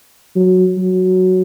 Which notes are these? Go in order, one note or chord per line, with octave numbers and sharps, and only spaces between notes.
F#3
F#3